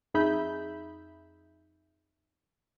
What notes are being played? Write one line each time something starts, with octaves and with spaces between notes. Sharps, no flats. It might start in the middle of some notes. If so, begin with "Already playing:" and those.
F2 D#4 G#4 E5 B5 G6